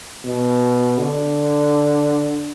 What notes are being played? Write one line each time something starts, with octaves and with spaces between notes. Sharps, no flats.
B2
D3